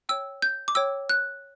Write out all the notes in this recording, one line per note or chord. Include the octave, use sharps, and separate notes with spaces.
C#5 G5 E6
G6
D6
C#5 G5 E6
F#6